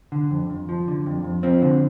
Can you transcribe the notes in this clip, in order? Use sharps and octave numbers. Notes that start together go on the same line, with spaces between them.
D3
F2
F2
F3
D3
F2
F2
F3 C4
D3